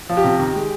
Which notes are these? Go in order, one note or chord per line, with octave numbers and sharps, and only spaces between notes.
F3
G4
C3
D#3
G#3